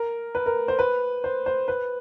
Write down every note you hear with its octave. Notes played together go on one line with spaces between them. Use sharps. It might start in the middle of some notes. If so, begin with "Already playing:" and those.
Already playing: A#4
B4
A#4
C5
B4
C5
C5
B4